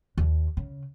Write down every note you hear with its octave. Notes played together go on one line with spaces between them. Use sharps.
D#2
C#3